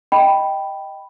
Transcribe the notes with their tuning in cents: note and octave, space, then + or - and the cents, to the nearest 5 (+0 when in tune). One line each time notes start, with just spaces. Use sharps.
D#5 +0 G5 +0 B5 +0